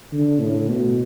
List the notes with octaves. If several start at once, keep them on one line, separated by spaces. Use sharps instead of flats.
D3
A2
B2